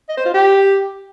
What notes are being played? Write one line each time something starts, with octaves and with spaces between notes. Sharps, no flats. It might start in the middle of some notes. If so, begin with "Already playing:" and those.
D#5
C5
F4
G4